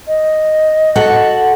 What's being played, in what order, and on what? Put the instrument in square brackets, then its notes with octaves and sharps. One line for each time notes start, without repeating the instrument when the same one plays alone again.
[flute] D#5
[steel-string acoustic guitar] F#4 A4 F#5